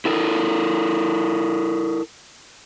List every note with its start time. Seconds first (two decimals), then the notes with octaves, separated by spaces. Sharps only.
0.05 E4 A4 A#4